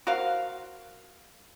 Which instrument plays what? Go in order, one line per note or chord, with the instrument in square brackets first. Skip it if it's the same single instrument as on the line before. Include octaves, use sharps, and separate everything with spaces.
[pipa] F#4 A#4 C5 F5